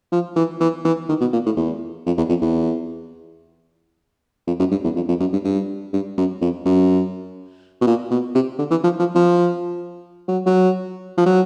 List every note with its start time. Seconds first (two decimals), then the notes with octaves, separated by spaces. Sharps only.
0.12 F3
0.36 E3
0.61 E3
0.85 E3
1.09 D#3
1.21 B2
1.33 A#2
1.46 A2
1.57 E2
2.06 F2
2.17 E2
2.29 F2
2.42 E2
4.47 F2
4.59 F#2
4.71 G2
4.84 E2
4.96 F2
5.08 F2
5.20 F#2
5.33 G2
5.45 G2
5.93 G2
6.17 F#2
6.42 F2
6.65 F#2
7.82 B2
7.87 A#2
8.11 B2
8.35 C3
8.59 D3
8.71 E3
8.84 F3
8.99 F3
9.15 F3
10.28 F#3
10.46 F#3
11.18 F3
11.26 F#3